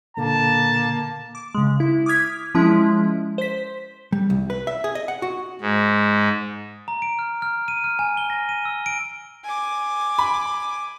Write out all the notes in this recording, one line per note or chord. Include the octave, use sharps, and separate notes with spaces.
A#2 D3 A#3 A5
D6
C#3 G#3
E4
D6 D#6 F6 G#6 B6
F3 G#3 C#4 E4
C5 B6
G3
C2
B4
E5
G#4
D#5
F#5
F#4
G#2
A#5
D7
F6
F6
D#7
F6
G#5
G7
A#6
D#7
E6
D7
G#5 D6
B5